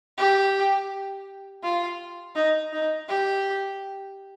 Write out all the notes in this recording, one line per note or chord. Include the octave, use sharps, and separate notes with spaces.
G4
F4
D#4
D#4
G4